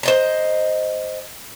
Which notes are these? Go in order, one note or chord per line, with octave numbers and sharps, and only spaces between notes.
C5 D#5 A#5